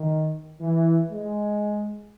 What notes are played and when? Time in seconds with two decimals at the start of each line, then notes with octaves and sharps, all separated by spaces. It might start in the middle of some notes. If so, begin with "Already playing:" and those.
Already playing: D#3
0.60 E3
1.10 G#3